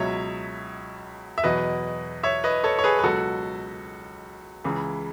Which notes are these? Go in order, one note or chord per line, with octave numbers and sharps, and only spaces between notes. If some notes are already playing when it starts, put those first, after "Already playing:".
Already playing: C#2 B2 F#3 C#5 E5
E5
E2 B2 F#3 B4 D#5
C#5 E5
B4 D#5
A4 C#5
C#5
G#4 B4
B4
C#2 B2 F#3 F#4 A4
C#2 C#3 E3